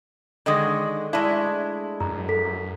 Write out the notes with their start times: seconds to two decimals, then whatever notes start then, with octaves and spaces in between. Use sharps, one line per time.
0.46 D3 D#3 G#3 D#5 D#6 A#6
1.13 G#3 A3 D4 E4
2.00 F#2 A#5
2.29 A4 B6